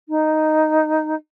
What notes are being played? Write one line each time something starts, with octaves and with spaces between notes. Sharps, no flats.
D#4